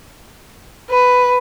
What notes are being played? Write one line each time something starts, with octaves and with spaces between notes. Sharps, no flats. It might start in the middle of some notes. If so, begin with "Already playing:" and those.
B4